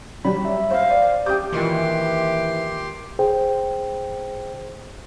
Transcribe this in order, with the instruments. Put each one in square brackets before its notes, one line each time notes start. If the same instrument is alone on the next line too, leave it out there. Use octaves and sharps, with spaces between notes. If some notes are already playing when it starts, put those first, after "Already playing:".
[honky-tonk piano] F#3 G3 [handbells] B5
[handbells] E5
[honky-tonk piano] C5 [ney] F5
[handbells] D5
[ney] G4 [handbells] G5 G6 [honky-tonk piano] D6 D#6
[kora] A#2 D#3 C#5 [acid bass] E3 [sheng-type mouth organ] G4 C6 D6
[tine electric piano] G#4 C5 G5